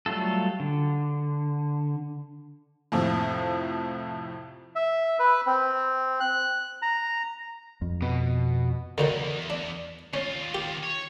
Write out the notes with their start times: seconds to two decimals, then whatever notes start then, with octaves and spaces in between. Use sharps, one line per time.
0.06 F#3 G3 A3 F4 A4
0.60 D3
2.92 F2 A2 C3 F3
4.76 E5
5.19 B4
5.47 C4
6.20 F#6
6.82 A#5
7.82 F2
8.02 B2
8.98 E2 D3 D#3 F#3
9.50 D4
10.14 D#2 C#4 F4
10.55 G4
10.83 C#5